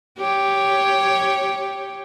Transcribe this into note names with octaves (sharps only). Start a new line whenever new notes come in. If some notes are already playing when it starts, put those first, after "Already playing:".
G4 C#5